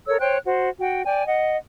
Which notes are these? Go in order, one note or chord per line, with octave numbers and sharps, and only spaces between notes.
A4 A#4 C#5 E6
C5 C#5 G5 F#6
F#4 C5
F#4 G5
D5 G5 G#5
D#5 F#5